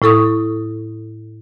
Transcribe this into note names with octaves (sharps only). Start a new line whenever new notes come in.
A2 E4 A4 C#6 D#6